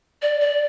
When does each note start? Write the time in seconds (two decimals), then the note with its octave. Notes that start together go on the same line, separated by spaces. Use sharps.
0.22 D5
0.41 D5